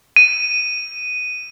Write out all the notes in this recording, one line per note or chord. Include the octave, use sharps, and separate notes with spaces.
D#7